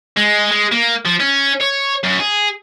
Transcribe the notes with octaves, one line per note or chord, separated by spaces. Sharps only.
G#3
G#3
A#3
F3
C#4
C#5
F#2
G#4